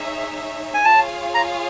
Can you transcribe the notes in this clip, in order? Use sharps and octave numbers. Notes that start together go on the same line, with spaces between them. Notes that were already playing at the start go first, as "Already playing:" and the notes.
Already playing: D#4 G#4 C#5 E5
G#5
F4 G#4 C#5 F5 A5
A#5